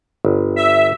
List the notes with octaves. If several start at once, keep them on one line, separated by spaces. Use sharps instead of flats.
G1
E5